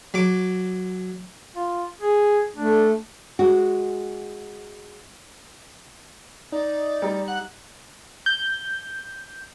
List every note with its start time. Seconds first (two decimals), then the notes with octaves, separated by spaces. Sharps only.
0.14 F#3 D6
1.56 F4
2.01 G#4
2.56 A3 D4
3.39 G#3 F#4
6.52 D#4 D5
7.02 G3 D#4
7.28 F#5 F#6
8.26 G6